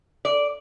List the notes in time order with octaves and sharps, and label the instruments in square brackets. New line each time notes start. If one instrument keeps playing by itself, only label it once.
[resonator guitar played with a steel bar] D5